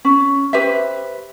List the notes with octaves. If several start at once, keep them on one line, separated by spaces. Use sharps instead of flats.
C#4
G4 B4 C5 E5